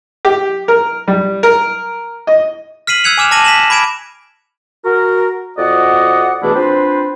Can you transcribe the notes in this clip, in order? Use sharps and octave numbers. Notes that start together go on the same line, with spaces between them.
G4
A#4
G3
A#4
D#5
F6 B6 C7 D#7 F#7
E6 F#6 G#6 C#7 F7
G#5 D6 F6 E7 F7
A5 D6 A#6 D#7 F#7
B6 E7 F#7
B5 D6 G#6 D7 E7
F#4 A#4
F2 F#4 D5 D#5 F#5
B2 E3 A3 D4 E4 G#4
C4 D4 F4 B4 C5